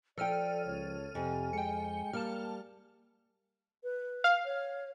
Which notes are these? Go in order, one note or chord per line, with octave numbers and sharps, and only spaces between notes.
F3 A4 D5 G5 F6 D#7
C#2 C#5
F2 C3 G#5
G#3 G5 C#7
G3 A#3 A5 F6
B4
F5
C#5